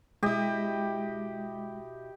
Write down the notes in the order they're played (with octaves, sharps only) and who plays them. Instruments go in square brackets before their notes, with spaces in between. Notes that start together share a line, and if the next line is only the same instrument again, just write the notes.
[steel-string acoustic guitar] B2 E4 [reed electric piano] G#3 [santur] G4 D#5